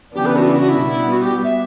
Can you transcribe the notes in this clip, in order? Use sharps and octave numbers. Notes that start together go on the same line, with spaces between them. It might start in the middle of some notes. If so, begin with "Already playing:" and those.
C#3 E3 B3 D4 G4
B4
F#4
E4
F#4
E4
B2 G3 B3
F#4
G4
E5